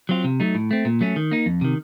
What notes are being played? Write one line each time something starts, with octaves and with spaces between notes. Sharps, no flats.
F#3 C4 F4
C3
F#3 A3 D#4
A2
A3 C4
A#2
F#3 A3 C#4
D#3
A#3 D#4
F2
C3 D#3